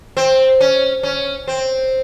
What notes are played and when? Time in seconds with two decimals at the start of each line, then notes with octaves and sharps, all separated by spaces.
0.17 C4
0.61 C#4
1.03 C#4
1.48 C4